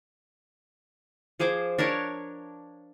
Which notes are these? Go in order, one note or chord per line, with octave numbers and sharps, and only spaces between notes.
F3 G#4 C5 D6
D4 A#4 C#5 A5